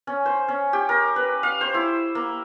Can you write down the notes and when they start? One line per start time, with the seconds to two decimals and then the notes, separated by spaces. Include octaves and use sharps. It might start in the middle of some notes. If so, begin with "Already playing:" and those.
0.07 C#4
0.26 C5
0.48 C#4
0.73 G4
0.89 A#4
1.16 B4
1.43 F5
1.61 C5
1.74 E4
2.15 A#3